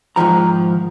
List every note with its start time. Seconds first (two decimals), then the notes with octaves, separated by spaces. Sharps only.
0.16 G#2 B2 D#3 F3 A#5